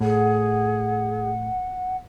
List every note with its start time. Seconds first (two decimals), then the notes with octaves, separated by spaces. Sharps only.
0.01 A2 G#4 F#5